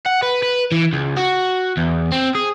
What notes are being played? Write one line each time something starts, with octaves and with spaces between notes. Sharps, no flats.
F#5
B4
B4
E3
C#2
F#4
E2
C4
G#4